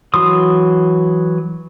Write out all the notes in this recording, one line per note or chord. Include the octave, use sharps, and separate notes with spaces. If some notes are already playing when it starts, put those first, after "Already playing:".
E3 F#3 C6 D#6